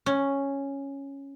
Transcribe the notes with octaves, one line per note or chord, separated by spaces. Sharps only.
C#4